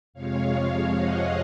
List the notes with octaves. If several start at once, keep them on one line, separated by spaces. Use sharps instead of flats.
F2 C3 F3 G#3 C#5 F5
D#5 F#5